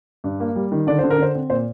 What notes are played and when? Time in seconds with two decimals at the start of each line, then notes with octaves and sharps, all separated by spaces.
0.24 G2
0.40 A#3
0.55 G3
0.72 D#3
0.87 D3 D5
0.99 D3 C5
1.10 A#4
1.18 D3 C5
1.35 C4
1.50 A#2 C5